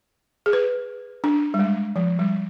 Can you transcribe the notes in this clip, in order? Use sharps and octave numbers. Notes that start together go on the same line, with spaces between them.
G#4
B4
D4
G3
G#3
F3
G3